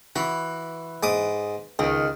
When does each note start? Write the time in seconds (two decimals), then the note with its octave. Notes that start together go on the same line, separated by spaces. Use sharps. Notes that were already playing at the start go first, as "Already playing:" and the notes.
0.16 E3 F#4
1.03 G#2 D6 D#6
1.79 C#2 D#3